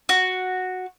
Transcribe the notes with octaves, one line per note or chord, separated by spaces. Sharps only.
F#4